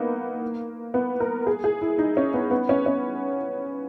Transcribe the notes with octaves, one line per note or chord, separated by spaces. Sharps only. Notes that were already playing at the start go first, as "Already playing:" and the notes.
Already playing: A#3 B3 D#4
B3
A#4
G#4
G#4
E4
D#4
C#4
B3
B3
C#4
C#4